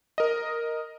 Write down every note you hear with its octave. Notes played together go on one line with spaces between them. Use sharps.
A#4 D#5